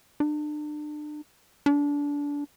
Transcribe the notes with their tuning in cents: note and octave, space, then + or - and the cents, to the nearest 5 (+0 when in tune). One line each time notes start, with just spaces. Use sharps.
D4 +35
D4 -25